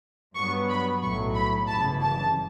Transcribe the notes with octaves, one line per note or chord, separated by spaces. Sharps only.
G2 F#3 B3 C#6
B5
B1 A2 F#3 C#6
B5
G1 F#2 C#3 E3 A5
A5